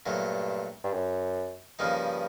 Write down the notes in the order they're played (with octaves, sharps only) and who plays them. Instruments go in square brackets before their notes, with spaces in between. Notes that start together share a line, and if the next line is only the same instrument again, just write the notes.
[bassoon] G2 [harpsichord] A#2 F#3 A3
[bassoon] G2
F#2
[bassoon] G2 [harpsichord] C#3 F3 A#3 D#4